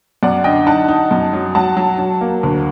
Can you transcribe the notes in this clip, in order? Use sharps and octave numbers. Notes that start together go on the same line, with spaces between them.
F#2 D5 F#5
D3 D#5 G5
D#4 F#5 A5
D#4
F#2
F#3
F#3 F#5 A5
F#3
F#3
A#3
D2